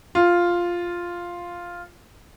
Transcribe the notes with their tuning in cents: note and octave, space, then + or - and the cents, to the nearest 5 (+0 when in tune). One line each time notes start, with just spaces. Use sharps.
F4 +0